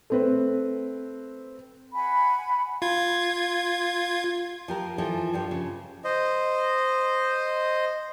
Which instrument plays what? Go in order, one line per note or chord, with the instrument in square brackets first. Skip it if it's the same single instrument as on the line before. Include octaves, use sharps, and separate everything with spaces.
[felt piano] A3 C4 B4
[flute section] F#5 G#5 B5
[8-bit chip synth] F4 G#6
[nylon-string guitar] F3 G4 A#4
E3 F3 A4
G2 F3 G4
C#3
[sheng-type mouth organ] C5 D#5